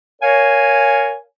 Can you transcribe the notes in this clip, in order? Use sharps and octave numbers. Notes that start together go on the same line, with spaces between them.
A#4 C#5 F5 G#5